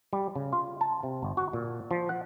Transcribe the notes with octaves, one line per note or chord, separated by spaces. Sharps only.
G3
C#3
F4
A5
C3
G1
F#4
A#2
F3
F#5